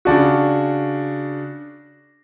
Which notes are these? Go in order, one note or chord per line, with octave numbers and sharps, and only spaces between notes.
C#3 D4 F#4